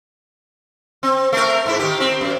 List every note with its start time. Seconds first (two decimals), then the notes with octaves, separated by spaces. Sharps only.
1.03 C4
1.33 A3 A#4
1.66 G#2 E4
1.79 D#3 G4
2.00 C4
2.21 F#2